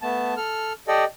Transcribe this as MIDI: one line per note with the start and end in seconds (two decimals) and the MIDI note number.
0.02 0.34 57
0.02 0.34 59
0.02 0.34 81
0.37 0.73 69
0.37 0.73 89
0.88 1.05 67
0.88 1.05 69
0.88 1.05 74
0.88 1.05 75